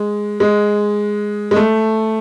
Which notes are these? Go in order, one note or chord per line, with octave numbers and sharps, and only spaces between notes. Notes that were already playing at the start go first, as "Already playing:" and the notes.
Already playing: G#3
G#3
G#3
A3